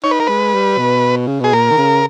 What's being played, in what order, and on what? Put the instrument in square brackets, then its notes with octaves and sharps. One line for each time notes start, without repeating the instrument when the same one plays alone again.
[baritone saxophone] D#4 [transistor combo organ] C#5
[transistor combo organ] B4
A#4
[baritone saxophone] G#3 [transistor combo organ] B4
[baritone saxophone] G3
B2
C#3
[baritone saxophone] B2 [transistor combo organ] G#4
[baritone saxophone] A#2 [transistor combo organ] A#4
[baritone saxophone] D#3
C#3